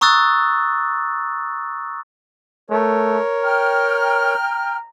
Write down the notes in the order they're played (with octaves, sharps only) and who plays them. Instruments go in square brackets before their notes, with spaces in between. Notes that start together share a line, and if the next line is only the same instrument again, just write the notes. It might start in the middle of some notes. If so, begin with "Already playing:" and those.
[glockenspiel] A#5 C#6 D#6 E6 F#6 A6
[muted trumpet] A3 [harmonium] A#4 C#5
[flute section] G5 F6 [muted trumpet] A#5